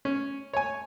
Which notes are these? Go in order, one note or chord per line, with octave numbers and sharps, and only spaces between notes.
C#4
C#5 G#5